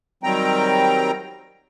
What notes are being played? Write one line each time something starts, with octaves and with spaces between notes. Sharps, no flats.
D#3 F#3 G3 C4 G5 A#5